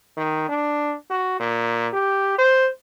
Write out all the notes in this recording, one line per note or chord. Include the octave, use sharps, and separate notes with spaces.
D#3
D4
F#4
A#2
G4
C5